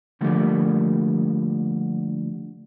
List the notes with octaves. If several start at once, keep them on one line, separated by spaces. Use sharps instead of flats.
D3 F3 G3 A3 A#3